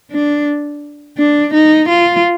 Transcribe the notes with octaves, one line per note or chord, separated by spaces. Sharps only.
D4
D4
D#4
F4